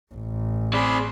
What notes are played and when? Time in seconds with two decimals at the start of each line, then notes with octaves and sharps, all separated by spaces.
0.14 A1
0.73 C4 G#4 D5 B5 C6